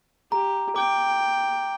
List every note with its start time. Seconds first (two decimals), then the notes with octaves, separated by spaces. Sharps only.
0.32 G4 A#5
0.76 G5 D6